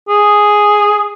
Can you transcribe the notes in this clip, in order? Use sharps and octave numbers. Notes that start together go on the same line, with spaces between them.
G#4